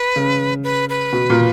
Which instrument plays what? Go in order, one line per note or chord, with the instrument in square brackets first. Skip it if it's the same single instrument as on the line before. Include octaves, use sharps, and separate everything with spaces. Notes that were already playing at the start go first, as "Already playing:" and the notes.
Already playing: [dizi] B4
[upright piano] C#3
[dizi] B4
B4
[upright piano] B2
A#2